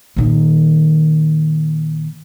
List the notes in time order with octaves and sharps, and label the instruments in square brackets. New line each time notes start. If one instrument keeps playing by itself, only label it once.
[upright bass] A#2 D#3